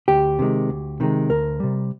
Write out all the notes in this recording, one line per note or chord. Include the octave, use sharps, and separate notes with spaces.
D2 G4
C3 D#3 G#3
D2
C3 D#3 G#3
D2 A#4
C3 G3